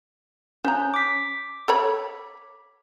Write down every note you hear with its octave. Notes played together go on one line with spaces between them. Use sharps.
C#4 C5 A#5 G6
D6 B6
A4 C#5 B5